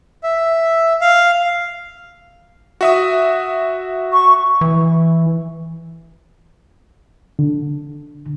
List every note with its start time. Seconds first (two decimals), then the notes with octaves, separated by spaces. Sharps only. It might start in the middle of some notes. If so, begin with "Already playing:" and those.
0.24 E5
1.01 F5
2.81 F#4 E5 D#6
4.13 C#6
4.61 E3
7.39 D3